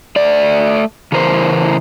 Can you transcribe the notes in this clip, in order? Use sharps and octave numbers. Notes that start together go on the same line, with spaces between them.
A3 D5
C#3 E3 A#4 C5